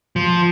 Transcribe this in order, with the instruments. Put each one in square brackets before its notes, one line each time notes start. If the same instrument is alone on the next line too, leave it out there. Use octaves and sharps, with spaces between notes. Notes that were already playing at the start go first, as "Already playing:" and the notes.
[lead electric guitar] F3